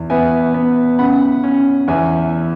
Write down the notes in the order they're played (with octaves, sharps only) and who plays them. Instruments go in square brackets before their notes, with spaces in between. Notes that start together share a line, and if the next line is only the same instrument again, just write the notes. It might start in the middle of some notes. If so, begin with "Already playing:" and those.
Already playing: [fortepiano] E2
B3 E5 G#5
B3
C#3 F#5 B5
C#4
E2 E5 G#5